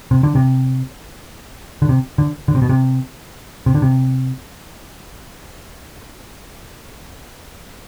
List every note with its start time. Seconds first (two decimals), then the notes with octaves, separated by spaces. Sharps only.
0.11 C3
0.23 D3
0.35 C3
1.82 D3
1.89 C3
2.18 D3
2.48 D3
2.55 C3
2.62 B2
2.69 C3
3.66 C3
3.75 D3
3.82 C3